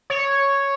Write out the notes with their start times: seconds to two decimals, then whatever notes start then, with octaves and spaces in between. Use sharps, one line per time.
0.10 C#5